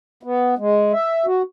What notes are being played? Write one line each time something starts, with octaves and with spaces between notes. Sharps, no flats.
B3
G#3
E5
F#4